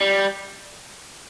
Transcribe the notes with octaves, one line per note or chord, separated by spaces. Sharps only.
G3